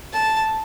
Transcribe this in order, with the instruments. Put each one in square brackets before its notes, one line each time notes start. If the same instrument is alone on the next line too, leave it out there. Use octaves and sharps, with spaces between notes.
[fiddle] A5